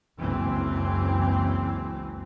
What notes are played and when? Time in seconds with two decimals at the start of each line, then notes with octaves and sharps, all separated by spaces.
0.18 F#1 C#2 E3 C4